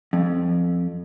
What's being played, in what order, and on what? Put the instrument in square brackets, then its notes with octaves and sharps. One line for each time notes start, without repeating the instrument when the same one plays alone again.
[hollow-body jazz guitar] F2